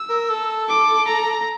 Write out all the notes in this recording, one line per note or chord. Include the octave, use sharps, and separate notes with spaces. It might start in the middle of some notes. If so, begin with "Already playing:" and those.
Already playing: E6
A#4
A4
D6
A#5